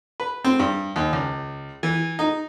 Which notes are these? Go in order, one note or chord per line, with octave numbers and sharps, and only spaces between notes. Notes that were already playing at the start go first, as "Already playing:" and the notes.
B4
C4
G2
D#2
C#2
E3
D#4